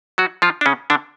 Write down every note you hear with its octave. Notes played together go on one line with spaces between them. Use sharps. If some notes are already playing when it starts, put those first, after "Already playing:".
F#3 F#4
F3 F4
D4
C#3 C#4
D3 D4